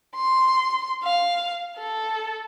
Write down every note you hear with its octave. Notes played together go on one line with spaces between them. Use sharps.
C6
F5
A4